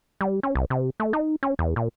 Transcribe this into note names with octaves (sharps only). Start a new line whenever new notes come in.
G3
C#4
C2
C3
A3
D#4
C#4
E2
A#2